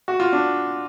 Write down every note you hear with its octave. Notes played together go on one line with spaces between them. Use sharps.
F#4
F4
D4